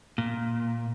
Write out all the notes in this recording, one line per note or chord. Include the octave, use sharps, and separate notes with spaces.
A#2